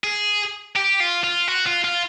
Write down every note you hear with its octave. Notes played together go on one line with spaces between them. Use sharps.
G#4
G4
F4
F4
F#4
F4
F4